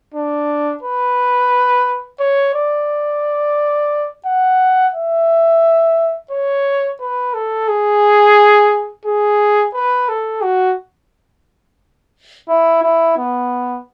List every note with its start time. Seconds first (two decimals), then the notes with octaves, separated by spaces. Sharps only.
0.14 D4
0.83 B4
2.20 C#5
2.54 D5
4.26 F#5
4.94 E5
6.31 C#5
7.00 B4
7.34 A4
7.68 G#4
9.06 G#4
9.74 B4
10.08 A4
10.42 F#4
12.49 E4
12.83 E4
13.17 B3